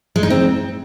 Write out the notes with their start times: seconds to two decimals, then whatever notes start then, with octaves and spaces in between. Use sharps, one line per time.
0.16 G#3
0.23 D#4
0.30 C4